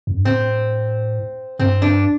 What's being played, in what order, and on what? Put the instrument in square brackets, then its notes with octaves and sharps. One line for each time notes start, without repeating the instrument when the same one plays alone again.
[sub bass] F2
G2
[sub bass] A2 [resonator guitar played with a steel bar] C4
[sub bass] G2 [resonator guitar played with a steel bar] C4
[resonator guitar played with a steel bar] D4